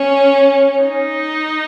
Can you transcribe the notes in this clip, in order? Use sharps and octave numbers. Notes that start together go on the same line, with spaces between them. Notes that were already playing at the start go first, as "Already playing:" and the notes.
Already playing: C#4
D#4